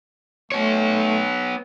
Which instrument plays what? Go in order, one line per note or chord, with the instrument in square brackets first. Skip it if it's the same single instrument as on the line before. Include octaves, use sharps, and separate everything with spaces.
[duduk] A3 [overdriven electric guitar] B3 C#5